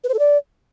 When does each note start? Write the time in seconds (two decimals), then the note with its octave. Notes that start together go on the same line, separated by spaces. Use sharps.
0.04 B4
0.09 C5
0.14 A4
0.19 D5